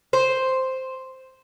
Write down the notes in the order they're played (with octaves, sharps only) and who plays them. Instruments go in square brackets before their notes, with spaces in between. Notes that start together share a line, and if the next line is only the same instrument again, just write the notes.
[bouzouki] C5